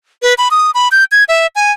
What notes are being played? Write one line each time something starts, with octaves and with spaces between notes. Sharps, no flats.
B4
B5
D#6
B5
G6
G#6
E5
G#5